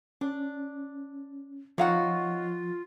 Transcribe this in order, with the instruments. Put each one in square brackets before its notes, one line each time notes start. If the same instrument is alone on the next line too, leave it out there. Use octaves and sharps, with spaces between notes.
[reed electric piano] C#4 [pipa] D4
[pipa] C3 D#4 F#4 [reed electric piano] F3 [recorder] F4 [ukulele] C#5 F5 F#5